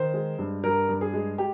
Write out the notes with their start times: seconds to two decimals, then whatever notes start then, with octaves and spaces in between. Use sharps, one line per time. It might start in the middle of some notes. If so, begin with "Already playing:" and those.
Already playing: D#3 C5
0.14 G#3
0.39 G2
0.64 G2 A#4
0.89 G2
1.01 G#4
1.14 G#3
1.38 G4